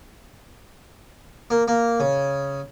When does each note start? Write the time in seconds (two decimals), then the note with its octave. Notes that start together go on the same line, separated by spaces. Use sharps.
1.50 A#3
1.68 A#3
2.00 C#3